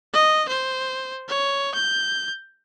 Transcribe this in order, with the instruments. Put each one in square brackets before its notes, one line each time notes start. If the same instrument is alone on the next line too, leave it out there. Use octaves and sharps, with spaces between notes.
[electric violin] D#5
C5
C#5
G6